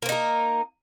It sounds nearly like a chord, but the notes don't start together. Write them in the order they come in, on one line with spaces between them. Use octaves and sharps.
A#3 C4 D#4 A#4